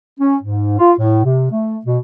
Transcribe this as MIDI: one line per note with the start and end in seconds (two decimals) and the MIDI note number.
0.19 0.36 61
0.43 0.77 44
0.79 0.92 65
0.98 1.23 45
1.24 1.50 48
1.51 1.78 57
1.86 1.97 47